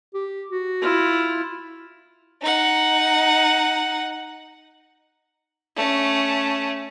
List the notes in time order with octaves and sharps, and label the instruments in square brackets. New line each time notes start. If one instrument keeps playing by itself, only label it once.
[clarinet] G4
F#4
[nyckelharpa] E4 F4
[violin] D#4 F#5
[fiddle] A3 C#4